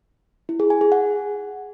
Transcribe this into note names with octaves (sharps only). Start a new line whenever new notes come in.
E4
G#4
G#5
G#4
F#5